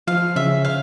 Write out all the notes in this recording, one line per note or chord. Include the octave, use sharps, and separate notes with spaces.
F3 F5
C#3 E5
F5